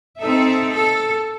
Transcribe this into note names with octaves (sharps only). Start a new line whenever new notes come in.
C4 D#4 A4 E5
A4